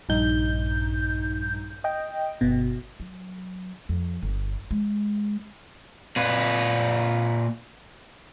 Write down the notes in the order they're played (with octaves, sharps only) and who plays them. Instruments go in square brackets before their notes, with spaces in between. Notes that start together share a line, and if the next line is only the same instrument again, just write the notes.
[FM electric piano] A#1 G2 D#4 G6
D#5 G5
G1 B2
[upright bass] F#3
F2
G1
G#3
[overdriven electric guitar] A#2 B4